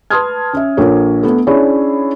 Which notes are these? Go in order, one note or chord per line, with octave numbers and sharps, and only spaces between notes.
B4 A5 C6 D#6 F6 G#6
C#4 E5
A#1 A4 A#4 C#5
A3 B3
C#4 D4 E4 G#4 C#5